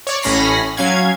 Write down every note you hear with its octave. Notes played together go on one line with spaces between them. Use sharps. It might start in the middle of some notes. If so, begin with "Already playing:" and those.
C#5 D5
A1 A2 C#4 B5 A#6 C7
F#3 C#4 F5 G#6